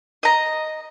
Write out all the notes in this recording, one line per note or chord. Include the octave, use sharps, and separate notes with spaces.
D#5 A#5